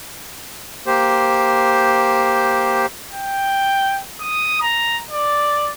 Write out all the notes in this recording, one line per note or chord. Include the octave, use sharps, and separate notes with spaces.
A#3 G4 C5
G5
D#6
A#5
D5